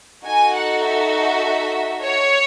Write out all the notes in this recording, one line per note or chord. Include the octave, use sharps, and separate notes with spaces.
D#4 F#4 A4 G#5
F#5
E5
C#5